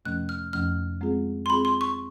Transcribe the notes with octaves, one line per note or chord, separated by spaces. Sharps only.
F2 C3 F3 A3 C#4 F#6
F6
F2 C3 F3 A3 C#4 F6
G#3 C4 F4 G#4
C6
G#3 C4 F4 G#4 B5
C6
C#6